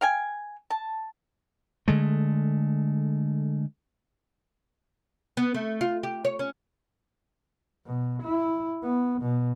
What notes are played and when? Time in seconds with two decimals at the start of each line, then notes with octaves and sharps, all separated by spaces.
0.01 F5 G5 G#5
0.70 A5
1.88 D3 G#3 A3
5.37 B3
5.54 A3
5.81 F4
6.03 G4
6.25 C#5
6.39 C#4
7.86 B2
8.22 E4
8.83 B3
9.22 B2